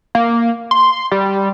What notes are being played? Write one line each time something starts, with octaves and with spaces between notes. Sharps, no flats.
A#3
C6
G3